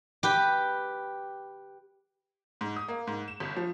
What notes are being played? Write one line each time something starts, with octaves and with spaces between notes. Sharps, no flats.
G4 B4
G#2
D#6
A#3
G#2
E7
G1
F3